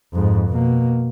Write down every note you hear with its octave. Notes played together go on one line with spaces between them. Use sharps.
F2 G#2
B2 A#3